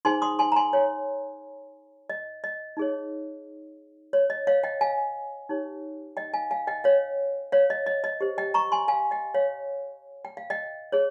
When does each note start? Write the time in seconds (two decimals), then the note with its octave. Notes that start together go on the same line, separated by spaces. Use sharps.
0.05 D#4 G#4 C5 G#5 C6
0.22 C6 D#6
0.39 G#5 C6
0.52 A#5
0.56 G#5 C6
0.73 C#5
2.10 D#5
2.44 D#5
2.77 D#4 G#4 C#5
4.13 C#5
4.30 D#5
4.47 C#5 F5
4.64 D#5 G5
4.81 F5 G#5
5.49 D#4 G4 C#5
6.17 D#5 G5
6.34 F5 G#5
6.50 F5 G#5
6.67 D#5 G5
6.84 C#5 F5
7.52 C#5 F5
7.70 D#5
7.87 D#5
8.04 D#5
8.21 G4 C5
8.38 D#5 G5
8.54 A#5 C#6
8.72 G#5 C6
8.88 F5 G#5
9.11 D#5 G5
9.34 C#5 F5
10.25 G5
10.37 F5
10.50 D#5 G5
10.92 G#4 C#5